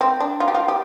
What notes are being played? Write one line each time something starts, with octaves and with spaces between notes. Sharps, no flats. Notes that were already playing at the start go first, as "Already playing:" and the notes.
C4
D4
F4
G4
F4
G4